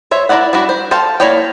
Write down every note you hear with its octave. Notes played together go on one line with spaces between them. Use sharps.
C5 C#5 E5
E4 A#4 C5 D5 F#5
G3 D4 E4 F#4
C5
A4 C5 F5 G5 A5
A#3 E4 C#5 D5 G5